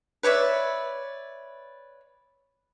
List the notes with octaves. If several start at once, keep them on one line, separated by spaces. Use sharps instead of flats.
B4 C#5 D5 E5